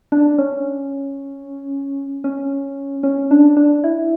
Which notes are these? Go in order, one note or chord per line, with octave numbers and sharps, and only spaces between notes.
D4
C#4
C#4
C#4
D4
D4
E4